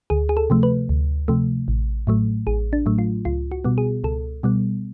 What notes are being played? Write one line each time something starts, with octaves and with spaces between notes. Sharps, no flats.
D2 G#4
G#4
A4
C3 F3 A3
B4
D2
C3 F3 A3
A1
A2 F#3 A3
A1 G#4
D4
A2 F#3 A3
F4
C#2 F4
F#4
B2 G3 B3
G#4
C#2 A4
B2 G3 B3